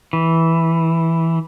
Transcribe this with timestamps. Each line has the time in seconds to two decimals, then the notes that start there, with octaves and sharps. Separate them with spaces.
0.13 E3